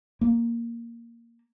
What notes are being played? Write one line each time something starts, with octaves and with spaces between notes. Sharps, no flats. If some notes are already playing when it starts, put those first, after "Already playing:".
A#3